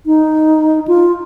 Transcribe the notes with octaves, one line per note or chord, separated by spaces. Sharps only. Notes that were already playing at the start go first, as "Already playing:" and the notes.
D#4
F4